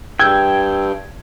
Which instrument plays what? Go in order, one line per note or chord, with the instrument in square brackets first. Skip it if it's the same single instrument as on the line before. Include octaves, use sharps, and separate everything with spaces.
[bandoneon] G2 [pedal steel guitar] G5 [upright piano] E6 G#6